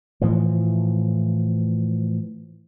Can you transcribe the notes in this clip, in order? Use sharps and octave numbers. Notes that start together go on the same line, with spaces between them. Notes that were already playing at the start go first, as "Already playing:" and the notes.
A2 E3 F3